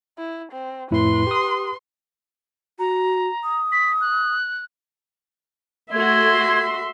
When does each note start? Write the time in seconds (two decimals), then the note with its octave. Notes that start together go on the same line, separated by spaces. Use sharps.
0.18 E4
0.52 C4
0.91 F2 A2 E4 B4 C6
1.27 G4 D#6
2.79 F#4 A#5
3.44 D#6
3.72 B6
4.01 F#6
5.92 A3 F#4 E5 C6 G#6